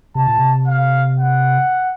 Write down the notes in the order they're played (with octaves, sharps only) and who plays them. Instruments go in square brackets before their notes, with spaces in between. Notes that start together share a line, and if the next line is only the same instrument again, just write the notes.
[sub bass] C3 [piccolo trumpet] A5
[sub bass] A#2
C3
[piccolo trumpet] F5
F#5